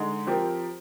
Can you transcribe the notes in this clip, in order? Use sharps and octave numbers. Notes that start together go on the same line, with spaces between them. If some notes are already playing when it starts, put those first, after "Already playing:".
Already playing: D3 G#3 D#4
F3 C4 G4 A#4